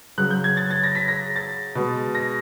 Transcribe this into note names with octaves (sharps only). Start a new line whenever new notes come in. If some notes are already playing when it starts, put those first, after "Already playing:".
C#3 F#3 F#6
G6
G#6
A6
A6
A#6
B6
A#6
A6
B2 G#3
A#6